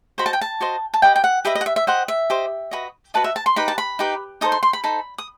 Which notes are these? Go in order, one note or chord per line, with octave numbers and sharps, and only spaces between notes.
F#4 C5 D#5 B5
A5
G5
A5
F#4 C5 D#5
A5
G4 B4 D#5 G5
G5
F#5
G4 B4 D#5 E5
D#5
F#5
E5
E5
G4 C5 D#5 F#5
E5
G4 C5 D#5
F#4 B4 D#5
F#4 B4 D#5 A5
E5
A5
C6
D#4 G4 B4 B5
A5
B5
D#4 G4 B4
D#4 A4 C5 D#6
C6
C6
B5
D#4 A4 C5 B5
D#6